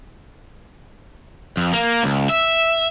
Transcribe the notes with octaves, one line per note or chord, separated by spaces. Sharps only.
F2
A#3
C#2
E5